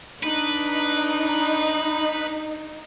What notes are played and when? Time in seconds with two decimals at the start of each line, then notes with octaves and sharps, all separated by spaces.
0.23 D4 D#4 B4